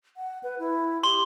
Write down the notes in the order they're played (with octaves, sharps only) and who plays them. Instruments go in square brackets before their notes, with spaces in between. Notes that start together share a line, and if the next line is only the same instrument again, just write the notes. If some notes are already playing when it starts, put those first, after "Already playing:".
[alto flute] F#5
B4
E4
[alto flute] G4 [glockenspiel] C6 G7